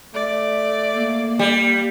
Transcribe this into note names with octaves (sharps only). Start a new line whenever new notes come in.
A3 D5
A#3
G3